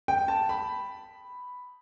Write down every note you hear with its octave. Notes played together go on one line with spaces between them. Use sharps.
G5
A5
B5